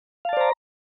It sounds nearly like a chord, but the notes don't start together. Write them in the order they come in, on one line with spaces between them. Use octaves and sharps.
F5 A5 D5 C5 A#5